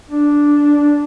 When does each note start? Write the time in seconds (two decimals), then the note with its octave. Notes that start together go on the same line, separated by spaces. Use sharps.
0.09 D4